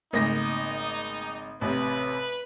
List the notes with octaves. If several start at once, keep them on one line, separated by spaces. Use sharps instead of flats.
G#1 C#3 A3 A#3 D#4 A#6
A1 C3 B4